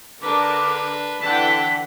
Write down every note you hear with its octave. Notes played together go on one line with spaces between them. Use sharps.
D3 D4 A#4 B4 D6
D3 E3 F#5 G5 A5 B6